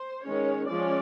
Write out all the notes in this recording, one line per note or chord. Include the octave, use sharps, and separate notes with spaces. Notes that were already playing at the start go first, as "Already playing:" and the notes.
Already playing: C5
D#3 G#3 C#4 C#5
F3 G#3 C#4 D5